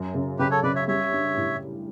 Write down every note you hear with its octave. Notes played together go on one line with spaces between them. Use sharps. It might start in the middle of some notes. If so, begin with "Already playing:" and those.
Already playing: F#2
C#3
C#3 G4 B4
A4 C#5
C#3 B4 D5
C#5 E5
G3 C#5 E5
D4
A2